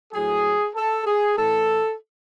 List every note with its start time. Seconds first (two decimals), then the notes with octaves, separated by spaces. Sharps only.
0.13 A2 F#3 G#4
0.75 A4
1.06 G#4
1.37 A2 E3 A4